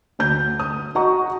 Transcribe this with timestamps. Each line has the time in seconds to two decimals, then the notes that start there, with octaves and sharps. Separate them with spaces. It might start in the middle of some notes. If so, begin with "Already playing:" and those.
0.19 D2 G6
0.59 D#6
0.95 F#4 D#5 F#5 A#5 C#6